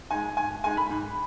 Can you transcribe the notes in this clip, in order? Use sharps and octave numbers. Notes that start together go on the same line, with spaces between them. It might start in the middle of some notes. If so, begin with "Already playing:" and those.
G#3 D#4 G#5
G#2 G#5
G#3 D#4 G#5
B5
G#2